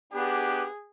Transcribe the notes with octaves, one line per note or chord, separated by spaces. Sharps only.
B3 D4 G4 G#4